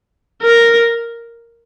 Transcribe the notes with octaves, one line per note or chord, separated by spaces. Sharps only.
A#4